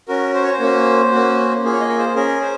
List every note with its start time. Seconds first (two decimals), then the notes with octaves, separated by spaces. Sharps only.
0.08 C#4 F#4 A#4
0.34 C5
0.43 C#5
0.53 C5
0.60 A#3 C#4 F#4
1.12 A#3 C#4 F#4
1.63 A#3 F4 G#4
1.73 C#5
1.80 D#5
1.89 A#4
1.98 C5
2.15 C#4 G#4 A#4
2.41 C5